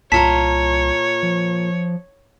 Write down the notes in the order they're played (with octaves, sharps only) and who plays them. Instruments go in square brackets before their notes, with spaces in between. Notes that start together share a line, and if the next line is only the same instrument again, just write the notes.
[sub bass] C2 [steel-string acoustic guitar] A#2 F4 A#5 [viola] C#5 [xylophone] A5 B6
[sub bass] F3